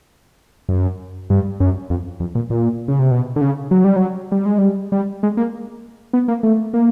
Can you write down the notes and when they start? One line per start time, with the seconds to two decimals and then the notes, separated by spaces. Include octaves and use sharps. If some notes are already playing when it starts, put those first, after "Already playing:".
0.69 F#2
1.30 G2
1.60 F#2
1.90 F2
2.20 F2
2.35 A#2
2.50 A#2
2.88 C#3
2.99 C3
3.11 B2
3.36 D3
3.41 C#3
3.71 F#3
3.84 G3
3.96 F#3
4.32 G3
4.46 G#3
4.58 G3
4.92 G3
5.23 G#3
5.37 A#3
6.13 B3
6.28 A#3
6.43 A3
6.74 A#3